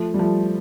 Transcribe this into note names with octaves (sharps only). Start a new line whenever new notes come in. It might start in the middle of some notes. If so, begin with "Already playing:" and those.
Already playing: F3 A3
G3
F3 A3